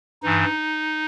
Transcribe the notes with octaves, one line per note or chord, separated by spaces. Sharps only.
G2 E3 D#4